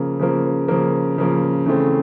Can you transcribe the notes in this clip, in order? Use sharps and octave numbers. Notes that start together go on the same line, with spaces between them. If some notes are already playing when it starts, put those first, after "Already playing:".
Already playing: C#3 F3 A#3
C#3 F3 A#3
C#3 F3 A#3
C#3 F3 A#3
C#3 E3 A3 C4